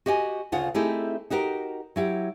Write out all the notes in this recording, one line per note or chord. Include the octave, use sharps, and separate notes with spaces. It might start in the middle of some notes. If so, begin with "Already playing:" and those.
F#4 G4 D#5 G5 G#5
D2 C#3 F4 F#5
A3 C4 D#4 E4 G4 G#4
D#4 F#4 G4 A#4
F#3 E4 G4